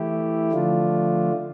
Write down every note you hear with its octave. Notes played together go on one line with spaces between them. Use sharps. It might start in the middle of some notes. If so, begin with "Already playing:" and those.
Already playing: E3 A3 E4 G4
D3 F3 A3 D4 F4